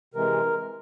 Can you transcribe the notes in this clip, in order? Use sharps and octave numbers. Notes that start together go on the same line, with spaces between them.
C3 E3 G#3 A#4